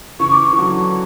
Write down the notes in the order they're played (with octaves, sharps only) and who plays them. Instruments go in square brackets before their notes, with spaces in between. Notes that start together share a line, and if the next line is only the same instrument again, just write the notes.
[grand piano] C#3 E3 [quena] C#6
[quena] D6
C#6
[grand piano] E3
D3 F#3